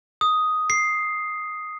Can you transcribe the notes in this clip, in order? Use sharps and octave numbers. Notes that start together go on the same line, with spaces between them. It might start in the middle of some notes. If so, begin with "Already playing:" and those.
D#6
C7